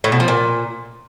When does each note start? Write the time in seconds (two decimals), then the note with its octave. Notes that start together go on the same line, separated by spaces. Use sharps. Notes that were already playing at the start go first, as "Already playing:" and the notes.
0.04 A2
0.12 B2
0.20 F3
0.28 A#2